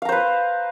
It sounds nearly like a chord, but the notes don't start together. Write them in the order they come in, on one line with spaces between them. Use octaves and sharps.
F5 A#5 C5 B4